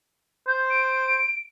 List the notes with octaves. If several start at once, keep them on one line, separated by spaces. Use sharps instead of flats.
C5 G6
D7